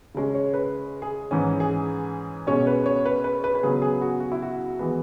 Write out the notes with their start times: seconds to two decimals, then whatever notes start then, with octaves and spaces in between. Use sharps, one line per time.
0.15 C#3 G#3 C#4
0.35 C#5
0.54 B4
1.02 G#4
1.31 G#2 E3 C#4
1.60 G#4
2.47 B2 G#3 C#4 C#5
2.67 B4
2.86 C#5
3.06 B4
3.24 B4
3.44 B4
3.55 B4
3.63 C#3 F#3 B3 G#4
3.82 G#4
4.02 F#4
4.20 F#4
4.32 E4
4.42 F#4
4.79 E3 G#3 B3